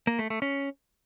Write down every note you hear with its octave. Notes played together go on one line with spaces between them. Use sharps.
A#3
A3
A3
C#4